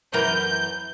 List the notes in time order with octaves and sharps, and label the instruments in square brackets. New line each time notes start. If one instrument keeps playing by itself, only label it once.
[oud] F#2 E3 A#4 [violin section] G6